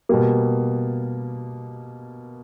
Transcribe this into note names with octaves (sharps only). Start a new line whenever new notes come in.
B2 G3 A#3